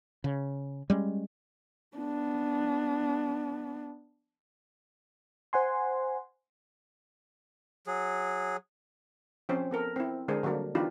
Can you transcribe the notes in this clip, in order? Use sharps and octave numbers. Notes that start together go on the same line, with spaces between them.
C#3
G3 G#3 C#4
B3 D4
C5 F#5 G#5 C6
F#3 G#4
F3 C4 C#4 C5
B3 A4 A#4
C4 E4
D3 G#3 D4 G#4 A#4 C5
D3 F#3 G3 A#3 D4
E3 B3 D4 D#4 F4 G4